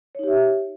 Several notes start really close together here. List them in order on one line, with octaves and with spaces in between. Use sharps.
C#5 D#4 G4 E5